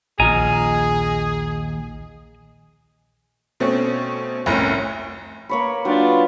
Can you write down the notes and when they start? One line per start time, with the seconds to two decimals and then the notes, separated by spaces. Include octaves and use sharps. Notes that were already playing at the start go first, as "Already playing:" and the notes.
0.20 A#1 D#2 F4 G#4 D#5 G#5 A#5
3.60 B2 A3 C4 C#4
4.46 F1 C2 A2 C#4
5.49 A#3 C#5 B5
5.85 F#3 D4 F4 B4 G5